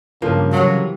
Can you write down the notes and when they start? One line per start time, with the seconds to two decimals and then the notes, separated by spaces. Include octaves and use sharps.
0.22 G2 C#3 F3 A#3
0.53 C3 E3 F#3